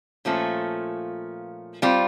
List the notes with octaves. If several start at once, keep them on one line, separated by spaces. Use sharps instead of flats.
A#2 F3 A3 C#4
G3 C4 F4